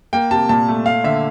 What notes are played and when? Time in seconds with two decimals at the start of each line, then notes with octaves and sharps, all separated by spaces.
0.13 A#3 G5
0.31 C3 A5
0.49 A#2 A5
0.69 A3
0.86 A3 F5
1.04 D3 E5